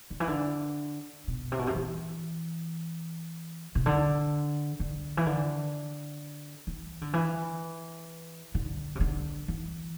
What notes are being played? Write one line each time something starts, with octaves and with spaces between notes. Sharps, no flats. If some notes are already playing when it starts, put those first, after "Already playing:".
D3
E3
D3
B2
C3
B2
C3
E3
C3
D3
D3
E3
D3
E3
D3
E3
D3
C3
D3
E3